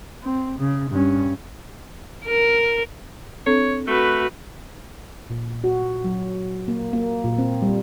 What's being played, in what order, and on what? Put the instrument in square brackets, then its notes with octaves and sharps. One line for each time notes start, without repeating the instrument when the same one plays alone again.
[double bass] C4
C#3
G2 C#4
[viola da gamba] A#4
[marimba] C4 D4 A4 [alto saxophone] C#5
[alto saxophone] A3 [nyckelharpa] F#4 B4
[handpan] A#2
F#4
F#3
A#3
A#3
A#2
C4
G3